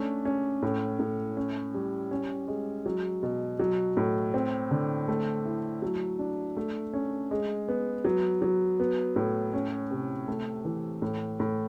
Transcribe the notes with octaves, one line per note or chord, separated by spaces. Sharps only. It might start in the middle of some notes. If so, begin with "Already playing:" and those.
Already playing: A3 C#4 D4
C#4
A2
A2
C#4
G3
C#4
G#3
F#3
B2
F#3
A2
C4
D3
A3
E4
F#3
D4
A3
C#4
G#3
B3
F#3
F#3
B3
A2
C#4
C3
A3
E3
A2
A2